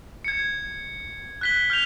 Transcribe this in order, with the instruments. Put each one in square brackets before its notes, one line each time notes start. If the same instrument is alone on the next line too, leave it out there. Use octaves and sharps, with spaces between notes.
[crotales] G#6 C#7
F#6 B6 G7
F6 G6 F7